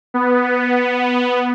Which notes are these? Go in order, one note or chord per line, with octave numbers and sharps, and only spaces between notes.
B3